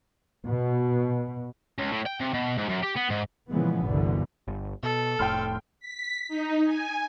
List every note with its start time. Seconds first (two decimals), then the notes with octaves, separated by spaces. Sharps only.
0.46 B2
1.78 C#2
1.92 A2
2.06 G5
2.20 C3
2.33 B2
2.58 G#2
2.69 F#2
2.83 G4
2.97 B3
3.11 G#2
3.51 A#2 C#3 E3 F3 G#3 B3
3.83 G1 C2 B2 D3 E3
4.48 G1
4.83 B2 A4
5.19 F1 A2 G5 C6 F6
5.80 B6
6.28 D#4
6.64 G#5